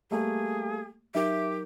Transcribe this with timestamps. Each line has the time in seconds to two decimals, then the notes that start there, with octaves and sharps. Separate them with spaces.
0.11 G3 A3 A#3 G#4
1.15 F#3 D#4 G4 A#4 E5